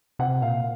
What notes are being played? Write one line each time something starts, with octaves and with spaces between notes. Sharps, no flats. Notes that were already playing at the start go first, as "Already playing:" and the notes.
C3 F#5
A#2 F5